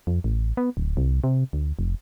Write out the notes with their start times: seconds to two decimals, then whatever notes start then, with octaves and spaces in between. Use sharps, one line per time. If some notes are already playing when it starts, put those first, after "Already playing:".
0.07 F2
0.24 A1
0.57 B3
0.77 D1
0.97 C2
1.24 C3
1.53 D2
1.79 F1